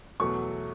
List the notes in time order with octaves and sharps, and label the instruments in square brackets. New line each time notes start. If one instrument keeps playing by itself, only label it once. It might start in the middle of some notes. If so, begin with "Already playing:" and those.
[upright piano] E2 B2 F#3 A3 C#6